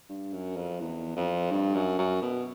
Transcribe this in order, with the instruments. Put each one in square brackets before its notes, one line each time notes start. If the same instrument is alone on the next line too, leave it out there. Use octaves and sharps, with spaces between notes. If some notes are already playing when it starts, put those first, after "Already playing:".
[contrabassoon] G2
F#2
F2
E2
F2
G2
F#2
F#2
B2